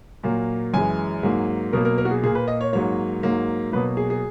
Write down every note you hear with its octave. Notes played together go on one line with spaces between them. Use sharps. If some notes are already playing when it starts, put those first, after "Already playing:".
A#2 F#3 A#3
F#2 E3 G#3 G#5
G#2 F#3 A#3
B2 F#3 A#3 A#4
A#4
A#4
F#4
G#4
A#2 A#3 G#4
B4
D#5
C#5
G#2 F#3 A#3 C#5
G#2 F#3 A#3
B2 F#3 A#3 B4
G#4
G#4